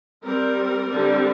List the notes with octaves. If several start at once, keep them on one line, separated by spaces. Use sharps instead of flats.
G3 C4 A#4
D3 G3 C4